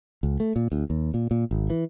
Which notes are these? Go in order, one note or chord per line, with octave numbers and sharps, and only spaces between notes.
C#2
A3
A#2
D2
D#2
A#2
A#2
G#1
E3